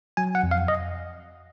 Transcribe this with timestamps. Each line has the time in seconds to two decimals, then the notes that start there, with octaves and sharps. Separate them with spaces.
0.17 F#3 G#5
0.35 F#5
0.43 F2
0.51 F5
0.68 D#5